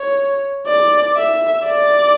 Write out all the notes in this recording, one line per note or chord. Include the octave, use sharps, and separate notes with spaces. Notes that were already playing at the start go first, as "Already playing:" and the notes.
Already playing: C#5
D5
E5
D5